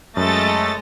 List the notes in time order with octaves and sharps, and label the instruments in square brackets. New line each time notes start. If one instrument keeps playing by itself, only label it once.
[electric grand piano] F#2 [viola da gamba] G#3 D#5 [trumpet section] A3 [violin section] A4 A6